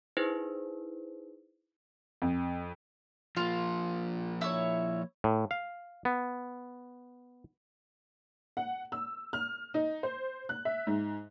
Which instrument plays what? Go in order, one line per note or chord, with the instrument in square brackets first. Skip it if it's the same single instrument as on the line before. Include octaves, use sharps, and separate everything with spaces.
[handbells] D#4 E4 G#4 B4 C5
[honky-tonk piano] F2
[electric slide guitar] F3 A#3 [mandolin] F4
[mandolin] E4 C#5
[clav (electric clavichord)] A2
F5
B3
[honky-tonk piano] F#5
E6
F6
D#4
C5
F#6
E5
G#2